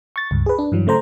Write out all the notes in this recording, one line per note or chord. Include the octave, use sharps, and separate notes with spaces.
C#6 A6
C#2 G2
G#4 B4
D4
G2 E3 F#3
C#3 A3 C5 A#5